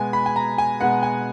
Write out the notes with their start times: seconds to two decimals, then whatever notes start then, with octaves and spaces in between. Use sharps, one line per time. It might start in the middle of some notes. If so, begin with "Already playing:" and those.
Already playing: B2 G#3 B3 G#5
0.13 B5
0.26 G#5
0.36 A#5
0.58 G#5
0.80 B2 G#3 B3 F#5
1.03 G#5